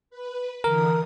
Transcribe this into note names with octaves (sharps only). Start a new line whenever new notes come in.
B4
D3 E3 A#4 D#6